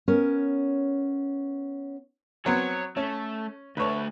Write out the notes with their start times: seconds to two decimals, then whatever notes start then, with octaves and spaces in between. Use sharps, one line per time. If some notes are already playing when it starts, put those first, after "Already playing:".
0.08 B3 C#4 A#4 C#5
2.46 F#3 B3 C4 C#5
2.97 A3 C#4
3.77 D2 A3 B4 C#5